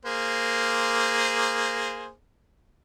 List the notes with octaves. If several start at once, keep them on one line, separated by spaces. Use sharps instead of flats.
A#3 G#4 C5